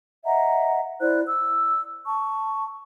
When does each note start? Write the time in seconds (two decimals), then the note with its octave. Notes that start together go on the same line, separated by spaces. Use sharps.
0.25 D#5 E5 F#5 A#5
1.01 E4 C5 D5 F#6
1.27 E6
2.06 A5 C#6